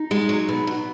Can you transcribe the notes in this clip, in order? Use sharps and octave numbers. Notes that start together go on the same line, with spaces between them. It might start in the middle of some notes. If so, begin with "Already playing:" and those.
Already playing: D#4
G#3
F#3
B2
B2